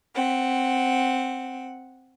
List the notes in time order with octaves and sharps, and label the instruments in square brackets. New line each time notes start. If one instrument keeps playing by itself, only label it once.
[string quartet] C4 F#5